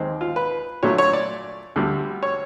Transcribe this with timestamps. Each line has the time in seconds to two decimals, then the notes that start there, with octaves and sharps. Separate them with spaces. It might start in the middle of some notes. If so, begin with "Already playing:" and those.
Already playing: D#2 D#3 G#3 C4
0.21 F4
0.36 B4
0.83 A#2 F#3 A3 D4 C#5
0.98 C#5
1.13 D5
1.76 D2 D3 G3
2.23 C#5